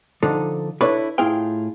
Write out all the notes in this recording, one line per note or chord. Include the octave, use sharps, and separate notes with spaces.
D3 F3 D4 D#4 A4
D4 E4 A4 B4 C#5 D5
A2 E4 F4 G#4 F5 G5